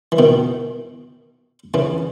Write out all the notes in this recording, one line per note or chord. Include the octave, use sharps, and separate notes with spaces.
E3
B2 D#3
C#3 E3